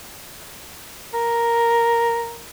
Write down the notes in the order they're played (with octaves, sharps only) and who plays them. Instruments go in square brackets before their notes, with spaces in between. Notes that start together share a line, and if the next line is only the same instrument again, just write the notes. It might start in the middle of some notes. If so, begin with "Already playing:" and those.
[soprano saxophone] A#4